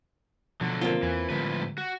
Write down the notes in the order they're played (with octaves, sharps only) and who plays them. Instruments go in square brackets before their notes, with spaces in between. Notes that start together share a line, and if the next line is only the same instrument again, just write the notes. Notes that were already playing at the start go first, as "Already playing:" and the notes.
[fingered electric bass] B2 F3 [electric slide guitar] D3 F#3
[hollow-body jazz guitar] A#3 C4 F4
[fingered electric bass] E2 [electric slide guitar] E3
[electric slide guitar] A2 F3 B4 [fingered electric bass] D3 G3 G#3
[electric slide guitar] F#4